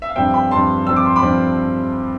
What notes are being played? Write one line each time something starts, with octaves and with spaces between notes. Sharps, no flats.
E5
F5
G2 F3 C4 E5 G5
G5 B5
G2 F3 C4 A5 C6
G2 F3 C4 E6
D6
C6
B5 D6
G2 F3 C4